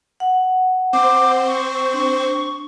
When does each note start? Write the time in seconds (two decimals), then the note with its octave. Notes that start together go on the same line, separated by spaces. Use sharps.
0.20 F#5
0.93 C4 C5 D6
1.47 C#6
1.94 D4